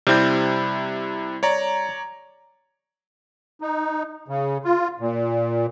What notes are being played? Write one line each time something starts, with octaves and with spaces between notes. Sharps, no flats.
C3 G3 C4 E4 G6
C#5 D5 A#5
D#4
C#3
F4
A#2